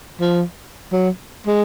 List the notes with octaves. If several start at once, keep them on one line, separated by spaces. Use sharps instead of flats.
F3
F#3
G#3